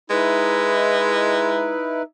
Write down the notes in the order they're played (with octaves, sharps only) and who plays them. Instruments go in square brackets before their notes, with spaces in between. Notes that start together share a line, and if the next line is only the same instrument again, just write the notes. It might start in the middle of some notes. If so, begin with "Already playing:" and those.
[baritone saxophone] G#3 [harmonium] D#4 E4 [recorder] B4